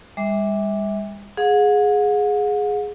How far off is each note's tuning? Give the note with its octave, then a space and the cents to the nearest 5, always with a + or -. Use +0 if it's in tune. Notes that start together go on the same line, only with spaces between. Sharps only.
G3 +45 E5 -25 D6 +0
G#4 +0 F#5 -40